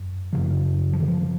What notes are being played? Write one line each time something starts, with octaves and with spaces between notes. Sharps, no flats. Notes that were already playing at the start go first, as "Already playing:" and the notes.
Already playing: F#2
F#2 C#3 F3
F3
D#3
F3